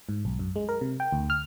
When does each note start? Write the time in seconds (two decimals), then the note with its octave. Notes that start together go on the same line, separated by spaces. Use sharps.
0.09 G#2
0.25 B1
0.39 F#2
0.56 G#3
0.69 A#4
0.81 C3
1.00 G5
1.12 D2
1.30 F6